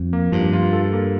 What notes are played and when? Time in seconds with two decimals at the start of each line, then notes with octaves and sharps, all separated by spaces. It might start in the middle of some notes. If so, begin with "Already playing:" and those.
Already playing: F2
0.13 A#3
0.32 G2 F3
0.53 F4
0.73 A4
0.93 A#3